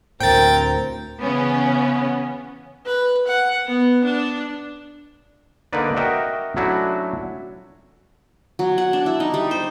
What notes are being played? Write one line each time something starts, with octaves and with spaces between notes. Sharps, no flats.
D2 A2 C4 A#4 G5 A6
C#3 E3 B3 C#4
B4
F#5
B3
D4
D3 A#3 D#4 A#4 B4 D5
F#4 A#4 D#5 E5 F#5 G5
F#3 A3 C#4 D4 E4 F#4
F#3
F#5
D4
E4
D#4
G3
C5